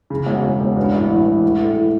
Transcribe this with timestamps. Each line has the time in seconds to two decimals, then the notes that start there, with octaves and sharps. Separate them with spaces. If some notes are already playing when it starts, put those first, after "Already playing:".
0.10 C#3
0.26 E1
0.44 E1
0.60 E1
0.77 G2
0.93 A1
1.10 E3
1.26 E3
1.43 A2
1.60 A3
1.76 A2